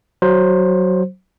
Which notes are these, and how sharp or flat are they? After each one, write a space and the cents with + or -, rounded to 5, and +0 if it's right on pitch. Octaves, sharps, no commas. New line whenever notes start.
F#3 +10 C5 +10